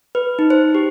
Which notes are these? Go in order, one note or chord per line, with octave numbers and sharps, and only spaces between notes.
B4
D#4
C5
G4